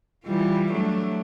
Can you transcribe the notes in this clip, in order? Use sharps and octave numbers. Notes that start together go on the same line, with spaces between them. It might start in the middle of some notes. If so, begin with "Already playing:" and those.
E3 G3 F4
F#3 A3 D4